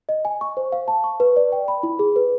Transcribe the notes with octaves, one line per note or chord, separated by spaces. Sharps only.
D#5
G#5
C#6
C5
F5
A5
C#6
B4
D5
G5
B5
E4
G#4
B4